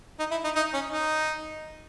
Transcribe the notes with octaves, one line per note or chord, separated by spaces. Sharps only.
D#4
E4
D#4
D#4
C#4
D#4